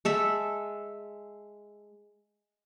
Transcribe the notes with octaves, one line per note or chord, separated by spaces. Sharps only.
G#3 A4 E5